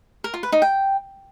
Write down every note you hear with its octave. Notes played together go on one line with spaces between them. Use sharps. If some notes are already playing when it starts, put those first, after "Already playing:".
A#4
F4
B4
D#4
G5